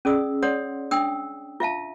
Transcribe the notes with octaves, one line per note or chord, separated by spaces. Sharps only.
C#4 G#4 D5 D#6 E6
C#5 D5 F#5 C6 D#6
D4 G5 D#6 E6
F4 E5 F5 A5